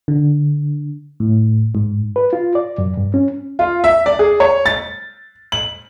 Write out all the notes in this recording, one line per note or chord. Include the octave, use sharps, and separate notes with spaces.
D3
A2
G#2
B4
F4
D5
F#2
G2
C#4
F4
E5
D5
G#4
C#5
A6
F#7